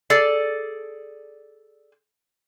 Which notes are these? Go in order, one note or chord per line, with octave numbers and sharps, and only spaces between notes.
G#4 A4 D5